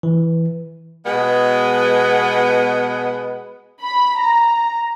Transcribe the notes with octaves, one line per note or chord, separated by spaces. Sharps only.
E3
B2 G#3 B3
B5
A#5